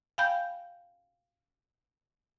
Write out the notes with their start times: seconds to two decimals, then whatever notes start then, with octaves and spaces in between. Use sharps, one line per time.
0.18 F5 G5 G#5 B5 G6